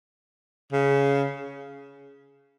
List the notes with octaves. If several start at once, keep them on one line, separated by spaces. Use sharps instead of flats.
C#3